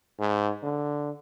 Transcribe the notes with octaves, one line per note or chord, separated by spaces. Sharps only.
G#2
D3